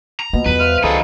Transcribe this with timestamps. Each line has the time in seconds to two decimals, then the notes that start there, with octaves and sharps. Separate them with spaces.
0.20 A#5
0.33 B2 A#3
0.46 E2 G3 B4
0.60 C5 E5 F5 F6
0.83 C#2 D#3 F#3 D#4 G#4 A4 D5 B5